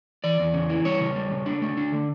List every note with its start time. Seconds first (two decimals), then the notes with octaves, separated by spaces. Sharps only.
0.24 E3 D5
0.40 E2
0.54 C#3
0.70 E3
0.85 G3 C#5
1.01 C#3
1.16 G3
1.32 C#3
1.46 D4
1.62 A3
1.77 D4
1.92 D3